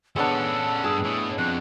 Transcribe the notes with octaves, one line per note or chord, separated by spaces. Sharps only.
G#3 B3 C#4 D4 A4 E6
G2 G#4 A5
A2
F2 F#6